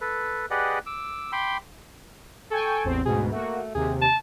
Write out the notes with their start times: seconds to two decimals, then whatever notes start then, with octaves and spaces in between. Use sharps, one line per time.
0.01 A4 B4
0.51 G4 G#4 B4 D5 D#5 F#5
0.86 D6 E6
1.32 G5 B5 C6 D6
2.51 A4 G5 G#5 C#6
2.84 A1 E2 C4
3.06 D2 G#2 B2 G#4
3.32 A3 A#3 F#4
3.75 D#2 C3 G#4
4.01 A5